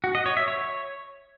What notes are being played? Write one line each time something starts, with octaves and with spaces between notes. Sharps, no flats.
F#4
D#5
C#5
E5
C#5